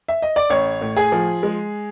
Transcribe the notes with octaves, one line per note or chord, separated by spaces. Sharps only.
E5
D#5
D5
A1 C#5
A2
G#4
F3
G#3